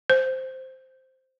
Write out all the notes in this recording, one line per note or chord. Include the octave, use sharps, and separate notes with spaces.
C5